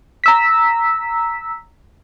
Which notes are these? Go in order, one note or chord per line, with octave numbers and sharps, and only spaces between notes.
A#5 E6 B6